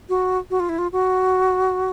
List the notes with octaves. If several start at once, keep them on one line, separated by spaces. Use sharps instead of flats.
F#4
F#4
F4
E4
F4
F#4